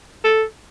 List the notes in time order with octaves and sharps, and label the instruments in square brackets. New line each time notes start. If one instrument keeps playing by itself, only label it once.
[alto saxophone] A4